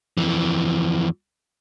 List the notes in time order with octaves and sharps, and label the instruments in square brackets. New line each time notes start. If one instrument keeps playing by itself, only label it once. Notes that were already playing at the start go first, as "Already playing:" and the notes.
[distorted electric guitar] F2 E3